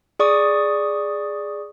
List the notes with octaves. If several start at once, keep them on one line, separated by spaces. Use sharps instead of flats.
G#4 D5 C#6 D#6